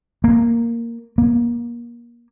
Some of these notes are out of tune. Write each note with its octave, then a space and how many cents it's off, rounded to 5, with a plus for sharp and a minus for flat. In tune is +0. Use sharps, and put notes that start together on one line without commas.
A#3 -5
A#3 +30